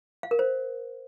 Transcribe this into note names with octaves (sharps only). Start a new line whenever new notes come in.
F5
A#4
C5